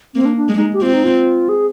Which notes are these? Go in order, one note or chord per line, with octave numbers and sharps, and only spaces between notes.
A#3 C4
D4
D4
G#3
D#4
G4
C4 F4
D#4
F4
G#4